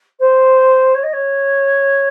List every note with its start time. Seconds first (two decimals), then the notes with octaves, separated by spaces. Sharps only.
0.19 C5
0.94 C#5
1.03 D#5
1.13 C#5